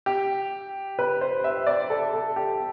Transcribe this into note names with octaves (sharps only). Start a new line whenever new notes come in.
G4
B4
C5
E5
D5
A4
A4
G4